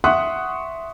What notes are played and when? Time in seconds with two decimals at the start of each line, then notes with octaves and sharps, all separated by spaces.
0.04 E5 F#5 C6 C#6 D#6 F#6